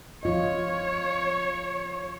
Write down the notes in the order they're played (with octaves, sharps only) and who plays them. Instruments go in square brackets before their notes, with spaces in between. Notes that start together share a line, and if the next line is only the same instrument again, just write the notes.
[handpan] F3 F4 D#5 [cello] C#5